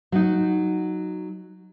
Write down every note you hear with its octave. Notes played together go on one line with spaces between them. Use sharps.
F#3 D#4